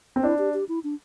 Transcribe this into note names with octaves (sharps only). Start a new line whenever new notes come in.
C4
D4 E4
G4
G4
E4
D4